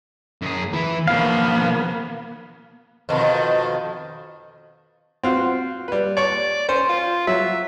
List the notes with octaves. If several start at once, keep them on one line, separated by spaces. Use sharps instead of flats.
F#2 G#4
E3 E4
B2 F3 A#3 B3 F5
F2 B2 D#3
C4 F4 F#4
G3 B4
C#5 D5 C#6
C#4 C5
F4
F#3 E5